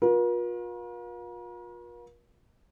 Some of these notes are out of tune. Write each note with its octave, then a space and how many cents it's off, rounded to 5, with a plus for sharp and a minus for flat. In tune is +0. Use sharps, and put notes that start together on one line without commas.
F4 +40 A#4 +45